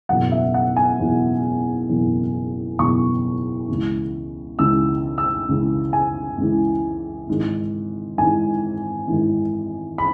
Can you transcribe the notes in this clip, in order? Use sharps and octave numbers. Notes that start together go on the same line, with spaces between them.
F#1 E2 B2 F#5
E5
F#5
G#5
F#1 E2 B2
F#1 E2 B2
F#1 E2 B2 C#6
C#2 C#3 E3
C#2 C#3 E3 E6
E6
C#2 C#3 E3
G#5
C#2 C#3 E3
G#1 G#2 E3
G#1 G#2 E3 G#5
G#1 G#2 E3
B5